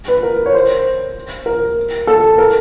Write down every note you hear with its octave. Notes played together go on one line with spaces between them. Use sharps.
B4
A#4
C#5
C5
A#4
A4
A#4